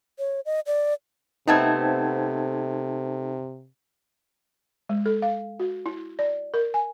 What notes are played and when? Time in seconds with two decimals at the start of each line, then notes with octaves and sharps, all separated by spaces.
0.19 C#5
0.46 D#5
0.67 D5
1.48 C3 A3 B3 C4 D#4 A5 G#6
4.89 G#3
5.06 A4
5.22 F5
5.60 F#4
5.86 E4
6.19 D5
6.54 A#4
6.74 G#5